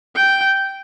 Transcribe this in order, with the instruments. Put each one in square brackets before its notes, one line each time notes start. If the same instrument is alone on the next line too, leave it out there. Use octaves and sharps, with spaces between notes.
[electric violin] G5